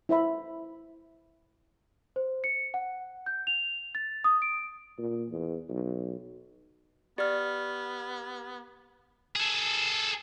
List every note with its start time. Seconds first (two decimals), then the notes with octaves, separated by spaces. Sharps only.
0.09 E4 C5 E5 B5
2.16 C5
2.44 C#7
2.74 F#5
3.26 G6
3.47 F7
3.95 A6
4.24 D#6
4.42 D7
4.98 A#2
5.30 E2
5.69 B1
7.18 B3 G4 D5 F6
9.36 G#4 A4